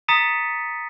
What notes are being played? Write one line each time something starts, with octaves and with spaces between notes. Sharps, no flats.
A#5 D#6 A6 B6 C#7 D#7